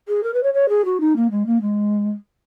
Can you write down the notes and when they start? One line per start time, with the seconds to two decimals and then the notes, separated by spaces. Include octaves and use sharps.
0.08 G#4
0.23 A#4
0.34 B4
0.43 C#5
0.54 C#5
0.69 G#4
0.85 F#4
1.00 D#4
1.16 A#3
1.31 G#3
1.46 A#3
1.61 G#3